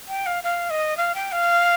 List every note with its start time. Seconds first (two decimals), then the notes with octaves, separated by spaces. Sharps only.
0.08 G5
0.26 F5
0.44 F5
0.70 D#5
0.97 F5
1.15 G5
1.32 F5